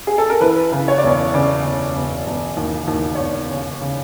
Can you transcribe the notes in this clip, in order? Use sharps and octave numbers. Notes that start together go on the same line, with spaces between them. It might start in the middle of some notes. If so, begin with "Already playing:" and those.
G#4
A4
A#4
E3 B4
C#3
C#5
D5
E1 C#5
C#3 D5
C#3
E1
E1
D#2
D#2
C#5
E1 D5
C#3
C#3